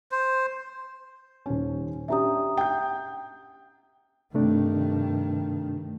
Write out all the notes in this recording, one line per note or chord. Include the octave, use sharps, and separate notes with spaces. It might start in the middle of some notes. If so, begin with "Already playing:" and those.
C5
D#1 C#4
C#4 D4 G4 E5 A#5 D#6
G5 G6
G2 C3 D#3 A3 D4